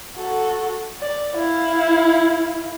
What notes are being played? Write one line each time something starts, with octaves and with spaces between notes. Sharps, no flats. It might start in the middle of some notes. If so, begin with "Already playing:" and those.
F#4 A4
D5
E4 F5